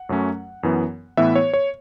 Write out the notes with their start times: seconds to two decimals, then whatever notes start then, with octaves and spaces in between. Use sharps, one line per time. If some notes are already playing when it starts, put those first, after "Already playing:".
Already playing: F#5
0.09 F#2 F#3 A3 C#4
0.63 F#2 E3 B3
1.17 A2 E3 B3 E5
1.36 C#5
1.54 C#5